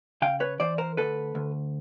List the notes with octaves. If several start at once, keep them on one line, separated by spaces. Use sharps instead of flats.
C#3 F5 G5
B4 C#5
E3 C5 D5
A#4 C5
D2 A4 B4
D2